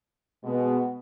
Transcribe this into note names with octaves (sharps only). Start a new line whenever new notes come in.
B2 G#3 B3